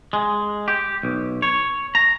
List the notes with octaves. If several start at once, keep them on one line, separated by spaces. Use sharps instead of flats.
G#3
G4
B1
C#5
A#5